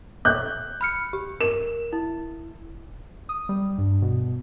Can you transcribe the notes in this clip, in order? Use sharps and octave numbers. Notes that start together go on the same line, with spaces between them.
F#6 G6
B5 F6 C#7
G4
A#4 E7
E4
D#6
G3
G2
B2